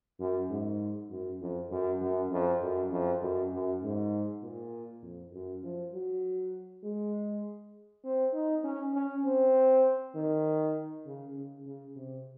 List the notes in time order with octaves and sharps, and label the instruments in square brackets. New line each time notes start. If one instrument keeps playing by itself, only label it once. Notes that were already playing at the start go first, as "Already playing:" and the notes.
[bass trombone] F#2
G#2
F#2
F2
F#2
F#2
F2
F#2
F2
F#2
F#2
G#2
A#2
F2
F#2
F3
F#3
G#3
C4
D#4
C#4
C#4
C4
D#3
C#3
C#3
C#3
C3